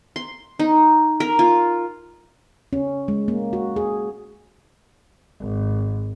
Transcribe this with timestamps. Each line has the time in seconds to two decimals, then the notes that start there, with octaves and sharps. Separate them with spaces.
0.16 C6
0.59 D#4
1.20 A#4
1.39 F4
2.73 C#4
3.08 G#3
3.28 A#3
3.53 F#4
3.76 G#4
5.40 G#1